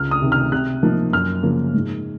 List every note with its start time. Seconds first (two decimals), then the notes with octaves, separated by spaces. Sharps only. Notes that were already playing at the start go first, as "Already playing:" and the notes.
Already playing: C#2 F6
0.11 D#6
0.22 C3 D#3
0.32 F6
0.52 C3 F#6
0.83 F3 A#3 D#4
1.13 F#2 F6
1.43 C#3 F3 A#3
1.74 G#2